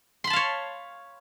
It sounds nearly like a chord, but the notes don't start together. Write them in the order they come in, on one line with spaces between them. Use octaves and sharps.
C6 B5 A5 F5 C#5